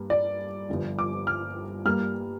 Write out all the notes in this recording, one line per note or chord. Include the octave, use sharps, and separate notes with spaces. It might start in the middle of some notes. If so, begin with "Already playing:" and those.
Already playing: G2 A#3
D5
G1 G2 F3
D6
F6
G2 G3 A#3 F6